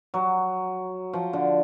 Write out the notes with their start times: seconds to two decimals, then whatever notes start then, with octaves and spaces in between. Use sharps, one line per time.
0.14 F#3
1.13 F3
1.33 D3